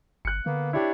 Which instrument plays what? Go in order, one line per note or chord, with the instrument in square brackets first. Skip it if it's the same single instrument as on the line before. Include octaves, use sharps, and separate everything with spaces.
[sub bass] G1 [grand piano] F#6 C#7
[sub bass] D3 [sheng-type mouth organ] A#3 B3
[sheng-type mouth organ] D4 C#5 [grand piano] E4 G4